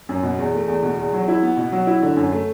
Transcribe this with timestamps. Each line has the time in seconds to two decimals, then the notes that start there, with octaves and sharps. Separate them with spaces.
0.09 F#2
0.23 B2
0.38 E2
0.53 A3
0.68 E2
0.83 B2
0.98 E2
1.13 F#3
1.28 E4
1.43 B3
1.57 B2
1.72 F#3
1.87 E4
2.02 D3
2.17 F#2
2.32 A3